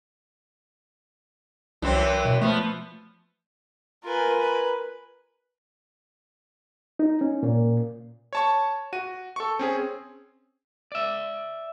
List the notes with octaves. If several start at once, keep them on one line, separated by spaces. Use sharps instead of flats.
C2 F#2 E3 C4
B2
F3 A3 B3
F4 A#4 B4 G#5
B4
D#4
C#4
A#2
C#5 A5 C#6
F#4 D#7
A4 C#6
C4 C#4 G#4
D5 E5